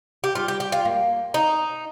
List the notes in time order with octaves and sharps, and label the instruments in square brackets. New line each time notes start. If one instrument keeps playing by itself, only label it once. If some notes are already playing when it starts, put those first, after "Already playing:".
[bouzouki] G4
[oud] G3 [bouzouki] F4
[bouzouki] G4
G4
F4
[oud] A#3
[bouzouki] D#4